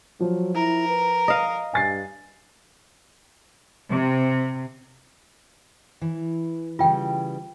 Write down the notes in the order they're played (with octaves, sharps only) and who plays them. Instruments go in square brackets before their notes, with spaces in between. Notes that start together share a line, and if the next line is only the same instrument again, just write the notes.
[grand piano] F3 [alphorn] F#3
[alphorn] E4 [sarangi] A#4
[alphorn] B4
[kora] D#5 F5
[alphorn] G2 [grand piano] G#5 A6 C7
[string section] C3
[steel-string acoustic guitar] E3
[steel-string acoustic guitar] C#3 E3 G3 [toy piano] F4 G5